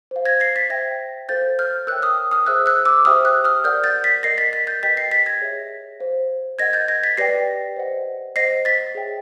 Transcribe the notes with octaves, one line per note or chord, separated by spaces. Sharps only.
C5 F5
G#6 A#6
A#6 C7
A6 B6
C5 E5 G5 G#6 A#6
A4 C5 F5 G6 A6
F6 G6
A#4 C#5 E5 G5 E6 F#6
D#6 F6
D#6 F6
G#4 C5 E5 E6 F#6
E6 F#6
D6 E6
G4 C5 E5 G5 D#6 F6
E6 F#6
D#6 F6
A#4 D5 F#5 F6 G6
G6 A6
A6 B6
A#4 D#5 F#5 A#6 C7
A6 B6
A6 B6
G6 A6
G4 B4 D#5 G5 A6 B6
A#6 C7
A6 B6
G#6 A#6
G#4 C#5 E5
C5 F5
A#4 D#5 F#5 G#6 A#6
G6 A6
G#6 A#6
A6 B6
G4 B4 D5 G5 A#6 C7
C5 D#5 F#5
C5 D#5 F#5 A#6 C7
A6 B6
G#4 C#5 E5 G5